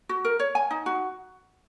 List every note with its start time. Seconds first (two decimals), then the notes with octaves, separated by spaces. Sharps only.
0.09 F#4
0.25 A#4
0.39 C#5
0.55 G#5
0.71 D#4
0.86 F#4